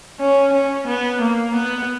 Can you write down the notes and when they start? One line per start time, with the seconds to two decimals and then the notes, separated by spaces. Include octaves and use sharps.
0.20 C#4
0.54 C#4
0.88 B3
1.22 A#3
1.55 B3